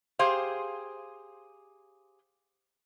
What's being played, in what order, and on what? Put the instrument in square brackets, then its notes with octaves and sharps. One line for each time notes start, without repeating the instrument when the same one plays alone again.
[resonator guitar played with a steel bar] G4 G#4 C5 F5